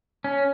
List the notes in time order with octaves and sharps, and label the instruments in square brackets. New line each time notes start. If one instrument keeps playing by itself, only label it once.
[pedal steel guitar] C#4